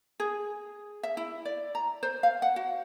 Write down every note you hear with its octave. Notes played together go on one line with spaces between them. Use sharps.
G#4
E5
E4
D5
A#5
C5
F5
F#5
F#4